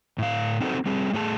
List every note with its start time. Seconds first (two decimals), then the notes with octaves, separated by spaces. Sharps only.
0.18 A2 F5
0.60 C4 D#4 F#4 G#4 A4 C5
0.86 G3 C4 G#4
1.13 A2 A3 G#4 A5